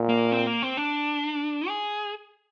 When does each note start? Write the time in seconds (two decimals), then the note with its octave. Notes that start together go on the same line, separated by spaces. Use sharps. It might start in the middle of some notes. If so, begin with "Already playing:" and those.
Already playing: A#2
0.09 A#3
0.32 C4
0.47 A#3
0.62 C4
0.77 D4
1.68 G#4